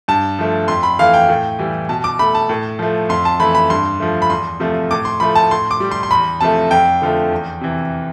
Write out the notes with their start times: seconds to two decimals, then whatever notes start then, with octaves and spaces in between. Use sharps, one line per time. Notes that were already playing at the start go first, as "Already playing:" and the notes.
0.08 G2 A5
0.39 F3 A3
0.68 F2 C6
0.83 B5
0.99 E3 A3 F5
1.14 G5
1.29 A2
1.59 E3 G3
1.89 B2 A5
2.04 D6
2.19 A3 B5
2.35 A5
2.49 A2
2.79 F3 A3
3.09 F2 C6
3.25 A5
3.39 E3 A3 B5
3.55 B5
3.70 G2 C6
4.00 F3 A3
4.22 B5
4.30 E2 C6
4.60 C3 F3 A3
4.91 A2 D6
5.05 C6
5.20 F3 A3 B5
5.35 A5
5.51 A2 C6
5.71 D6
5.80 G3
5.91 C6
6.03 C6
6.11 E2 B5
6.41 C3 F3 A3 A5
6.71 F2 G5
7.02 D3 F3 A3
7.32 E2
7.61 C3 E3